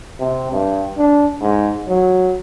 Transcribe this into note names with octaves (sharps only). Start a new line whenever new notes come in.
C3
G2
D4
G#2
F#3